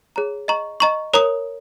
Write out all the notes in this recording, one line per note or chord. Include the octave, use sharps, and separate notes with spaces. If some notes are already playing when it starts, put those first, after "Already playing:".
G#4 C#5 A#5
D#5 A#5 C#6
D#5 A#5 C#6
A#4 C#5 A#5 D#6